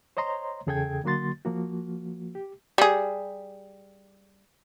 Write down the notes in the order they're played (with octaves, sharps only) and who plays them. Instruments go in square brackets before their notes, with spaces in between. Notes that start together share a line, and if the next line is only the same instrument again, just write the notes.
[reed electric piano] C5 C#5 D#5 A#5 C6
E2 C#3 G#4 A4 G5 G#6
D3 F#3 A#3 F#4 C6 A6
F3 A#3 F#4
G4
[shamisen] G3 G#4